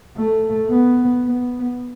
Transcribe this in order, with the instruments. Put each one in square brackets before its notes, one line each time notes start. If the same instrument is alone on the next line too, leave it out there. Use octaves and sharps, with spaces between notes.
[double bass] A3
B3
B3